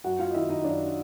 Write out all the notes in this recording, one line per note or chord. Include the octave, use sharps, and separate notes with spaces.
F#2 F#4 F#5
F4 F5
D#5
D#3 E4 E5
D#4 D#5
F#2 D4 D5